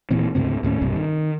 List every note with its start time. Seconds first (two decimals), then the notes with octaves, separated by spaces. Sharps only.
0.11 D#1 A#2 E3 C4
0.35 D2 G#2 C#3 C4
0.63 D#2 A2 B3 C#4
0.82 B1 G2 C3
0.96 D#3